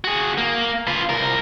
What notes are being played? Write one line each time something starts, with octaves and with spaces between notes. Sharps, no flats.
F#4 G#4
A#3
F4 B4
C2 A#4